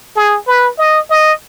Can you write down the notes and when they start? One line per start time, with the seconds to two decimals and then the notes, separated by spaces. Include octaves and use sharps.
0.16 G#4
0.48 B4
0.78 D#5
1.10 D#5